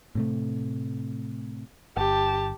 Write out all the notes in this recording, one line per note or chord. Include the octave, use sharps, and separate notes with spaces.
A2 C3 A3
G1 G4 A5